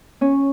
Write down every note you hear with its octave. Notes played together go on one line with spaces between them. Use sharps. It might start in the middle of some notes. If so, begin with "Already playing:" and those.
C#4